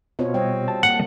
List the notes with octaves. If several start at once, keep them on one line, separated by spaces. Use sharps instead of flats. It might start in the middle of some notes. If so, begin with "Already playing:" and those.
B2 C4 F4 C#5
G3 C4 C#5 D#5
A5
A#3 F#5